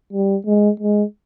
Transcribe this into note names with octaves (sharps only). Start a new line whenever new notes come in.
G3
G#3
G#3